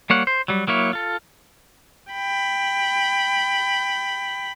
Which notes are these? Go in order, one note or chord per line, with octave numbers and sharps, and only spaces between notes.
G3 A#3 C#5 F#5
C5
F#3 G3
F#3 A#3 E4 C#5
F4 A4
G5 B5